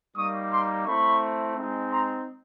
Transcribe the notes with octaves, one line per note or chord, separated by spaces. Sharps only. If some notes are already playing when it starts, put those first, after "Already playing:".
G3 A#3 D#4 C#6 D#6
C6 D6
A3 C4 E4 B5 C#6
G#3 C4 D#4
A#5 C6